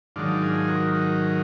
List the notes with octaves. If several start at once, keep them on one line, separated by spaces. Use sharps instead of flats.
G#2 D#3 F#3 D4 F4
F4 G#4
F#4 A#4
F#4 A#4